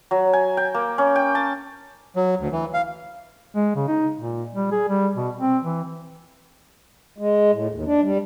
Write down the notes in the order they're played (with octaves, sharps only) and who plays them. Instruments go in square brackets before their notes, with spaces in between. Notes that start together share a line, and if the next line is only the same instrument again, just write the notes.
[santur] F#3
G#5
G5
A#3
C#4
G5
A5
[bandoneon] F#3
D2
E3
F5
[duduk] G#3
C#3
D#4
A#2
G3
G#4
G3
B2
C4
E3
[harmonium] G#3
A2
D#2
D4
G3